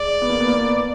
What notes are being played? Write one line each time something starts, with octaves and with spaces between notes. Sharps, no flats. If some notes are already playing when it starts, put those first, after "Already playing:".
Already playing: G#3 D5
B3
A#3
B3
A#3
B3